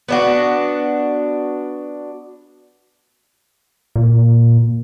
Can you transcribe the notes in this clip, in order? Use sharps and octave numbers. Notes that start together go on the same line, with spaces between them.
B3 D4 F#4
A#2